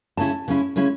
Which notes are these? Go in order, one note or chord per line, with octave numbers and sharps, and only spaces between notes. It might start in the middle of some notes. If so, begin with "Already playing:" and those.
C#3 G#3 C#4 E4 A5
C#3 G#3 C#4 E4
C#3 G#3 C#4 E4